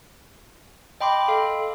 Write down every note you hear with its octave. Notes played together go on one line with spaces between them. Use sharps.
D#5 G5 B5 C6 D6
A4 F5